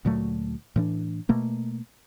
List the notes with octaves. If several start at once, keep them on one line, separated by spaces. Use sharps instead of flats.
D2 A#2 F#3 A3
A2 E3 D4
B2 A3 A#3